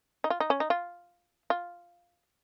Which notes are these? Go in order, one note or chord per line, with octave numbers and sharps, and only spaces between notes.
D#4
F4
D#4
C#4
D#4
F4
F4